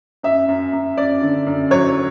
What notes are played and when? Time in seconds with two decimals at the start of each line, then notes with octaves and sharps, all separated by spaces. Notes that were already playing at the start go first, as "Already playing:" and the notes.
0.23 F#2 E5
0.48 F#2
0.73 F#2
0.97 F#2 D5
1.22 D3
1.46 F#2
1.71 F#3 C#5